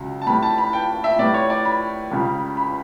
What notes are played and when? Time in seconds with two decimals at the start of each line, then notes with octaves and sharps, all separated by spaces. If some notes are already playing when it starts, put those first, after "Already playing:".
Already playing: C#2 C#3 F#3
0.22 A5
0.27 A2 G3 B5
0.43 A5
0.58 B5
0.73 G5
1.04 E5
1.19 A2 G3 D5
1.34 C#5
1.50 D5
1.65 B5
2.11 C#2 C#3 G3
2.57 B5